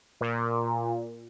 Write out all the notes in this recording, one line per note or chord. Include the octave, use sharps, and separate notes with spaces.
A#2